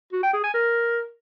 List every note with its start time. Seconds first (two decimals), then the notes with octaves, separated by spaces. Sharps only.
0.13 F#4
0.23 G5
0.33 G#4
0.44 G#5
0.54 A#4